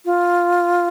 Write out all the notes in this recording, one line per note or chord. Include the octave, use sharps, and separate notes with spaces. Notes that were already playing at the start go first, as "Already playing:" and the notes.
F4